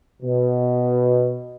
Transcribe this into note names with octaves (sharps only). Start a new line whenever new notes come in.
B2